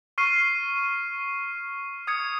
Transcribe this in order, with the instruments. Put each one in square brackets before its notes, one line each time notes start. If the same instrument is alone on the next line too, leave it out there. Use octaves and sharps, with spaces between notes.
[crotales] C#6 F6 C7 D#7
D#6 G#6 C#7